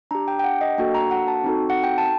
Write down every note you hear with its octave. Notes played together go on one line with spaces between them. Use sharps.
D4 G4 A#5
G5
G5
F#5
D#5
A#3 D4 F#4 A4 G5
A#5
F#5
A5
C4 D#4 F#4 A4
F#5
G5
A5